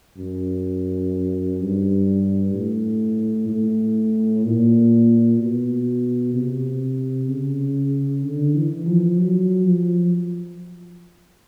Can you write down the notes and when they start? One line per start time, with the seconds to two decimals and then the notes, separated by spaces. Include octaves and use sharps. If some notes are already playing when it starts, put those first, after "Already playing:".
0.18 F#2
1.60 G2
2.54 A2
3.49 A2
4.45 A#2
5.39 B2
6.34 C3
7.28 C#3
8.24 D3
8.55 E3
8.87 F3
9.18 F#3
9.65 F3